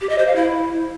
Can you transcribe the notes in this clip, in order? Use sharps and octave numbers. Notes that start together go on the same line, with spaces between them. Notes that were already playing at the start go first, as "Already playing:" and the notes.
G4
D#5
C5
F5
E4